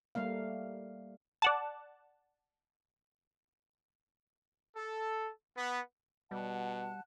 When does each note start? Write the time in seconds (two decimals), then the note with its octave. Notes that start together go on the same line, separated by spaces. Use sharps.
0.15 G3 A3 A#3 F5
1.42 D5 F#5 A5
4.76 A4
5.56 B3
6.31 B2 G3 F#5 A5 F#6